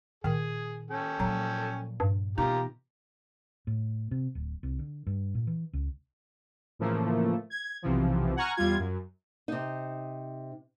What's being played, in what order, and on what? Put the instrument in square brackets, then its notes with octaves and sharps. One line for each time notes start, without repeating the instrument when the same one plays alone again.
[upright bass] A#2 D#4 [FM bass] D#3 [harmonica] G#4
[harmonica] C#4 A4 G5
[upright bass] A#2 F3 [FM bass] F#3
[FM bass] G2
[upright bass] B2 E3 [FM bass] D#4 [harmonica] F4 G4 A#5
[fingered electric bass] A2
C3
D1
C2
D3
G2
A#2
E3
C#2
[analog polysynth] A2 C#3 E3 F3 A3 A#3
G#6
B1 C3 E3 F3
F#5 G#5 A#5 C#6 F6
E2 G3 F4 G#6
F#2
[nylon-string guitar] C3 D#4